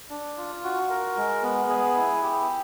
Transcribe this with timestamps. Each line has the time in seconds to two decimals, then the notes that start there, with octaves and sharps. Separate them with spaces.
0.10 D4
0.38 F4
0.64 F#4
0.90 A#4
1.17 G#3
1.42 B3
1.69 G#4
1.96 E4
2.23 G4